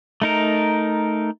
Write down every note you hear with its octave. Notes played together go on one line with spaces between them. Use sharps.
A3 D#4 A#4